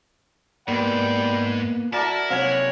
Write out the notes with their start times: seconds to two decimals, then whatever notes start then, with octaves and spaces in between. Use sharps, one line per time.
0.68 G#2 A#3 B3 D5 G5 B5
1.93 E4 F#4 A#4 D5 A5
2.30 C3 F#3 C#5 F5 F#5 G#5